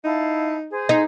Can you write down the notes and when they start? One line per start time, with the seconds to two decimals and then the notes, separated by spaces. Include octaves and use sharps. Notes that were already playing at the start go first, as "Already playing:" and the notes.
0.04 D#4 E4 F5 A5
0.71 G#4 C5
0.89 D#4